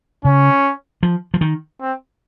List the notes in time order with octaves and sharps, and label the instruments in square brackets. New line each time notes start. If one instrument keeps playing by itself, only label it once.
[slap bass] C#3 [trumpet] C#4
[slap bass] F3
F3
D#3
[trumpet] C4